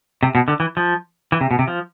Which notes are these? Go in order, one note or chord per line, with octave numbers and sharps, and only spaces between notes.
C3
B2
D3
E3
F3
E3
C3
B2
C3
F3